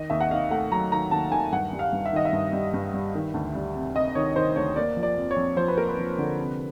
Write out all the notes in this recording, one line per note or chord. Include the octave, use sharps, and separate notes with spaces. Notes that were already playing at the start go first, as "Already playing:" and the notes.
Already playing: D#3 D#5
D#2 E5
F#5
D#3 F5
A3 F#5
F#3 A#5
D#3 A#5
D#2 A5
D#3 G#5
G2 F#5
G3
F5
G2
E5
D#3 D#5
E5
G2
G3
G2
G3
D#3
D2
G3
C3
C3 D#5
D#3 C#5
D#3 C5
D2 C#5
A#3 D5
F3
D5
F2
C#5
F2
F3 C5
B4
A#3 A#4
B4
F3
D3
C3